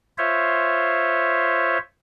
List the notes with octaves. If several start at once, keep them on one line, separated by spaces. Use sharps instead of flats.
F4 C5 C#5 E5